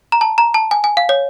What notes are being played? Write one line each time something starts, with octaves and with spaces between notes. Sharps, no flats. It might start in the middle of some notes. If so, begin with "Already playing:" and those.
A#5
A5
A#5
A5
G#5
G#5
F5
C#5